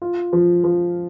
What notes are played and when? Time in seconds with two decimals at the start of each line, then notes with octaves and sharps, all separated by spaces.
0.02 F4
0.33 F3
0.64 F3